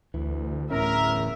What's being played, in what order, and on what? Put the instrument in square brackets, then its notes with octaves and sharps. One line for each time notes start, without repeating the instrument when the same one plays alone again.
[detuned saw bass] D2 [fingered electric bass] E3
[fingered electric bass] D1 A2 C#4 [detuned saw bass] E2 [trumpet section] A#4 [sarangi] E5